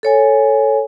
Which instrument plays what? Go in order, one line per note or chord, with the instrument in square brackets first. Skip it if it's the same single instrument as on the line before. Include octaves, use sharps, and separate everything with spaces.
[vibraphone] A4 C#5 G#5